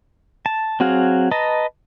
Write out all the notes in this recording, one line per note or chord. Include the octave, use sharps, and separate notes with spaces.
A5
F#3 C4 F#4 G#4 F5
B4 D#5 A5 A#5